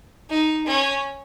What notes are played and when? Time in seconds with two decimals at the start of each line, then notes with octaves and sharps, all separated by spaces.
0.30 D#4
0.66 C#4